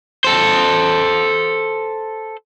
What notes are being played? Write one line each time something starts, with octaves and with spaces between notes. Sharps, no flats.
A4 C5